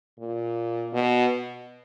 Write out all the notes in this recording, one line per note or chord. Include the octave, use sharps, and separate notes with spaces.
A#2
B2